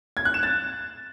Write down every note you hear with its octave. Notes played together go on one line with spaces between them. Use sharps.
G#6
F#6
E7
A6